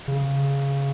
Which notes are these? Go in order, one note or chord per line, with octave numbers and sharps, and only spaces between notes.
C#3